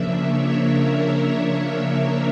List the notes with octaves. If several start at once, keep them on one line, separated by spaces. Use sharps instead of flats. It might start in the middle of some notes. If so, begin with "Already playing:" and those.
Already playing: C#3 F3 A#3 D4 E5
C#5
A#4
C#5
A#4